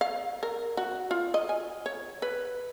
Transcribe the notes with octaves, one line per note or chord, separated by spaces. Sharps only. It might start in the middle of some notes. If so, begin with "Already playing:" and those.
F5
A#4
F#4
F4
D#5
G#5
C#5
B4